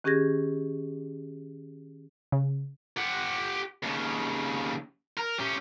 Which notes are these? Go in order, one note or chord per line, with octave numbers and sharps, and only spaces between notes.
D#3 C#4 G4 G#4 G#6 A#6
C#3
G4 F#5
D#2 C#3
A#4
C#4 G4